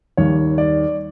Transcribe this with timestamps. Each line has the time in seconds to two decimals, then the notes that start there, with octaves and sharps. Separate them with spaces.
0.17 D#2 D#3 G3 C#5
0.58 D5